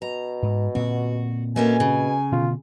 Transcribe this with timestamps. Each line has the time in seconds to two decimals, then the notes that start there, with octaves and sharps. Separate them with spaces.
0.02 B2 A#5
0.43 G#2
0.75 A#2 C4 F#4
1.56 B2 A3 A#3 C#4 G#5
1.80 C#3
2.32 B2 D3 F4